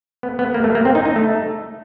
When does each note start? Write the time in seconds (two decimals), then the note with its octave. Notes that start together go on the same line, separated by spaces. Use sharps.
0.23 B3
0.39 B3
0.54 A#3
0.64 A3
0.75 A#3
0.85 C4
0.95 D#4
1.05 D#4
1.16 A3